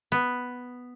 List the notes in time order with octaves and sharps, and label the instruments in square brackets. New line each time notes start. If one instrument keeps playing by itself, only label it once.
[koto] B3